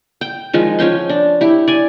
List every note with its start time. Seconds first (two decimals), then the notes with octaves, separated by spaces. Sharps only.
0.21 G5
0.53 D#3 F3 G#3
0.79 F3 C#4 G5 C6
1.09 D4
1.41 E4 G4
1.68 D5 G#5